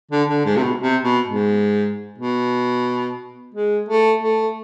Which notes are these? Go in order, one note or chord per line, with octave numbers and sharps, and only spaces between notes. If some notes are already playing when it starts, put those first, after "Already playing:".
D3
D3
G#2
C3
B2
C3
B2
G#2
B2
G#3
A3
A3